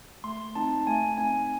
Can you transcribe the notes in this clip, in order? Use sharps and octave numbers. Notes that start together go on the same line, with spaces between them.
A3 C6
C4 D#4 A5
A3 G#5
C4 D#4 G#5